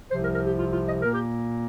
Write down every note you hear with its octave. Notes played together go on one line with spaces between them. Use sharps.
C2 C3 F3 C5
A#4
A#4
G4
F4
F4
D#5
A#2 A#3 A#4
G4